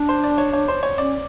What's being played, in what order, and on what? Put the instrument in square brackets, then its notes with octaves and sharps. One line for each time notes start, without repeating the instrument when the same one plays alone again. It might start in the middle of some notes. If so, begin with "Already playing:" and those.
Already playing: [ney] D4
[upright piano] C5
D5
C#5
C#5
C5
C#5
[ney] C#4 [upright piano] D5